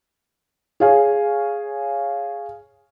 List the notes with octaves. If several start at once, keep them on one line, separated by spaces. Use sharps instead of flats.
G#4 C#5 F5 G#5